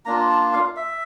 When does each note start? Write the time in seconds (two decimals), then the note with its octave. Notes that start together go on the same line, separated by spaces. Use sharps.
0.05 A#3 D4 F4 A#5
0.30 A5
0.53 F5
0.76 E5